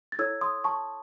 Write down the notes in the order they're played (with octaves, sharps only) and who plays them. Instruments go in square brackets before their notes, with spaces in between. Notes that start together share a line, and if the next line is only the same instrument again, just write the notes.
[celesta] A6
E4 A4 C#5 E6 G#6
C6 D#6
A5 C#6